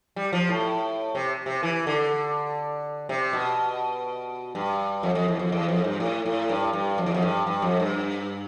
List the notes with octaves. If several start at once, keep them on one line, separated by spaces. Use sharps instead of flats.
G3
F3
A2
C3
C3
E3
D3
C3
B2
G2
F2
F2
E2
F2
E2
F2
G2
A2
A2
G2
G2
F2
E2
F2
G2
G2
F2
G2